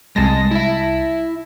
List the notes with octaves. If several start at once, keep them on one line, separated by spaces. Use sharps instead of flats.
C2 G#3 A5 A#6
E4 E5